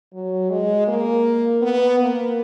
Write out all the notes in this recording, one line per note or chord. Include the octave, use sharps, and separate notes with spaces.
F#3
G#3
A#3
B3
A#3